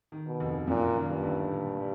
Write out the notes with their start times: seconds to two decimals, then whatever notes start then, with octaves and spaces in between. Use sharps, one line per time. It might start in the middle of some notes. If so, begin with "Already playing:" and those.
0.12 D#3
0.26 B2
0.40 F1
0.67 F#2 A#2
0.96 D#3
1.10 G2
1.23 G1
1.52 A#2
1.80 G3